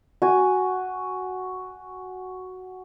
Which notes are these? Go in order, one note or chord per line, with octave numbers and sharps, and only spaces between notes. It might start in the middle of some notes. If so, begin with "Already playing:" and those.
F#4 G#5